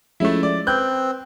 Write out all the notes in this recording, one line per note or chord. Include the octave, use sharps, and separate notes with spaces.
F3 G#3 A3 C#4 E4
D5
C4 B4 F#6 G6